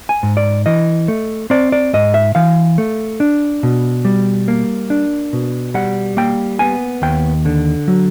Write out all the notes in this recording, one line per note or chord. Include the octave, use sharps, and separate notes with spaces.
G#5
G#2
D5
E3 D#5
A3
C4 D5
D5
G#2 D#5
E5
E3 F5
A3
D4
B2
G3
A#3
D4
B2
G3 F#5
A#3 G5
B3 G#5
D#2 G5
D3
F#3